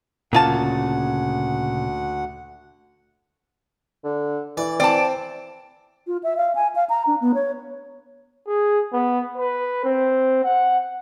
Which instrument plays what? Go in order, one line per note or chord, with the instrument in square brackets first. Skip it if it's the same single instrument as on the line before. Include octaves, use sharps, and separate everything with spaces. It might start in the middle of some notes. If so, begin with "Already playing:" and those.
[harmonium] D2 F#5 [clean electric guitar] A#2 C#3 [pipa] A#3 F4 A5
[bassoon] D3
[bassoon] E3 [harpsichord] D5
[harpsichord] C4 [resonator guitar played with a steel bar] D5 A5
[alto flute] F4
E5
F5
G#5
F5
A#5
D4
B3
C#5
[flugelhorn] G#4
B3
B4
C4
F#5